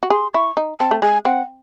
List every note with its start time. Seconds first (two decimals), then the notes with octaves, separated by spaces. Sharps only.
0.03 F#4
0.10 G#4 C6
0.34 E4 C#6
0.57 D#4
0.80 C4 A5
0.91 A3
1.02 G#3 G#5
1.25 C4 F#5